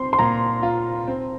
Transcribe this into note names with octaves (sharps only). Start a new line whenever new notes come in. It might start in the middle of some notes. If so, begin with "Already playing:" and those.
Already playing: C4 C6
C6
A#2 A#5
F4
C4